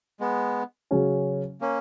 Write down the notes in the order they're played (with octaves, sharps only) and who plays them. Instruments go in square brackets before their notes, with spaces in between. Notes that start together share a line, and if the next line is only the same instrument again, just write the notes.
[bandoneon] G#3 B3
[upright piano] C#3 F#3 C#4
[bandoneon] A#3 C#4